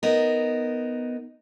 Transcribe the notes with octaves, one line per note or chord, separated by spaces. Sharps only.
B3 D#4 A#4